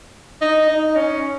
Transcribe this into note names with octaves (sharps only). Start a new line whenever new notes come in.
D#4
D#4
C#4